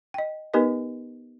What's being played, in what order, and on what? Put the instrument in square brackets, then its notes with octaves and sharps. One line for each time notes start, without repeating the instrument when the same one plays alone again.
[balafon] D#5 G5
B3 D#4 G4 A#4 B4 D#5